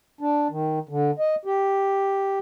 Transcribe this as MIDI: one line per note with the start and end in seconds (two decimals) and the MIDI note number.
0.21 0.48 62
0.50 0.79 51
0.89 1.11 50
1.19 1.35 75
1.45 2.39 67